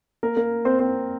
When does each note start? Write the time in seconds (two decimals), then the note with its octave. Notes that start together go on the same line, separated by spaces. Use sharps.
0.23 A#3 A#4
0.37 A#3 A#4
0.65 C4 C5
0.79 C4 C5